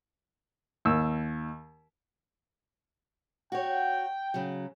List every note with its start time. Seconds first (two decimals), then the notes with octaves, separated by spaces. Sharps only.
0.85 D#2 E6
3.52 F#4 C#5 G5
4.34 C#3 F#3